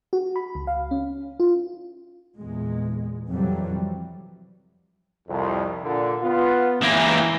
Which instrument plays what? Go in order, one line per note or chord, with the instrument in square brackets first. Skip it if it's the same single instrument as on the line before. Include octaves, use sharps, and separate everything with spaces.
[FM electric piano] F#4
B5
C#2
F5
C#4
F4
[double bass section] E2 A#2 G#3
F2 C3 E3 F#3 G3
[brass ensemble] C2 F2
A#2 D3
B3 F4
[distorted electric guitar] C#2 A#3 [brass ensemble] E3